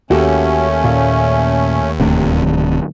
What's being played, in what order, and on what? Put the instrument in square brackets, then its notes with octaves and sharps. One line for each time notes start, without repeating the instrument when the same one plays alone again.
[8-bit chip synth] D#2 [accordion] A3 C#4 [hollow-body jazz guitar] F#4 G4 A4
[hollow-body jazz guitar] A#2
[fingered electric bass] D1 D#3 A3 [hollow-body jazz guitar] C3 D4